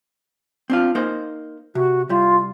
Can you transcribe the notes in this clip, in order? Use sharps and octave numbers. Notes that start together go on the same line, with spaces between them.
C4 D4 F4
A#3 D#4 C5
C3 F#4
C2 G3 F4